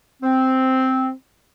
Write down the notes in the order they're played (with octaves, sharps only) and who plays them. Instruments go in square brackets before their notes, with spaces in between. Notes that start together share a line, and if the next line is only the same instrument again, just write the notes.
[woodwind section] C4